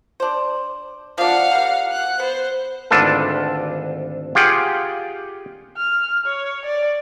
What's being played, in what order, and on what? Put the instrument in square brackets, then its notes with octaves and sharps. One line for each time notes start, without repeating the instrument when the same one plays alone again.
[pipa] D4 C5
[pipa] F3 A#3 D4 [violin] F5 F#5
[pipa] G3 A#4
[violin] F#5 F#6
[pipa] B3 [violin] C5
[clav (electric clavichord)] G#1 D2 D4 F4 A4 B4
F4 G4 G#4 F#5 G5
[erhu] F6
C#5
D5